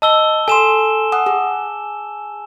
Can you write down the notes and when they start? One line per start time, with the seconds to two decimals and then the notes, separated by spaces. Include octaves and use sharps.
0.02 D#5 A5 E6 G7
0.48 A4 G#5 C6 E7
1.12 F#5 D#6
1.26 G#4